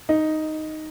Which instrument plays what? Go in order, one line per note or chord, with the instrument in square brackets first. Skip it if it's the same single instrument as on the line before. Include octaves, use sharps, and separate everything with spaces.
[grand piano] D#4